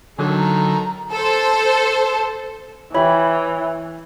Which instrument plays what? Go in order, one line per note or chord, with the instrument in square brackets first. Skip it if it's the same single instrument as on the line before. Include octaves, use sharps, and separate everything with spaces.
[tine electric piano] D3 F#3 [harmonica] D#3 A4
[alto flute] A#5
[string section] A4 C5
[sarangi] E3 [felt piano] E4 G5 [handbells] C#5 B5